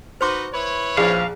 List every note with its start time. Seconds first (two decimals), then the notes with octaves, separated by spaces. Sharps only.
0.21 D#4 F#4 B4 C5 C6 D6
0.53 E4 B4 C#5
0.97 A#1 F3 G#4 F5